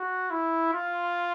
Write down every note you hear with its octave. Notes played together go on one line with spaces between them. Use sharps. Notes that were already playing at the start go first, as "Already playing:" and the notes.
Already playing: F#4
E4
F4